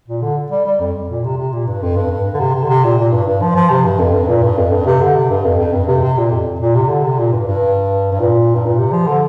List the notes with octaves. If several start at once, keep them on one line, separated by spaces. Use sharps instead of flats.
A#2
D3
G3
G3
F2
A#2
C3
C3
A#2
G2
F2
G2
G2
D3
C3
C3
D3
C3
A#2
A#2
G2
G2
F3
F3
C3
G2
F2
G2
A#2
G2
F2
G2
C3
D3
C3
G2
F2
F2
G2
C3
C3
A#2
F2
A#2
C3
D3
C3
A#2
G2
G2
G2
A#2
G2
A#2
C3
F3
D3